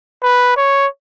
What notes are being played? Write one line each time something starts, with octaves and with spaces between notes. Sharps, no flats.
B4
C#5